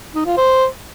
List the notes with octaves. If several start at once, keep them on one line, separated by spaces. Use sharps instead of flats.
D#4
F4
C5